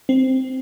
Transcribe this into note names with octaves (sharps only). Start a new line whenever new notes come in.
C4